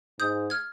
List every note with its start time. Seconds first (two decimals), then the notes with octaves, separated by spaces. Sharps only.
0.19 G#2 D#6 G6
0.50 F6 G#6